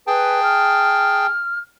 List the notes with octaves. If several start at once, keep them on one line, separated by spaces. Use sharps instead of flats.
G#4 B4 G5 A5
F6